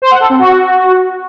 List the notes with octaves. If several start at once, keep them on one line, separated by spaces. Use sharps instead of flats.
C5
F#5
A4
C4
F#4